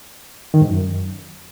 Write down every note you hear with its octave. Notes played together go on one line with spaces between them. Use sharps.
D#3
G#2
F#2